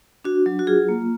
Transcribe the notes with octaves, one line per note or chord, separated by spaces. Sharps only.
D4 F#4
F#3
F#4
F4 G#4
A#3